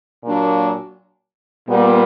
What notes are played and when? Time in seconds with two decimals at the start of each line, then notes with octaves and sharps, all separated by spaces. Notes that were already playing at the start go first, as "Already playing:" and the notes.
0.24 A#2 F#3 A#3 D4
1.68 A#2 G3 B3